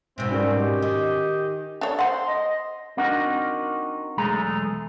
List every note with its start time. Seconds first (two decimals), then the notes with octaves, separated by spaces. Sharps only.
0.18 G#2 B2 C4 E5
0.31 G3 C#4 F#4 A#4
0.56 G4 D#5
0.82 D#3 D#5
1.81 D4 C#5
1.99 C5 F#5 C6
2.28 D#5
2.97 C4 D4 D#4 F#4 A#4 F#5
4.18 B1 E2 G#3 A3 G#4 A#5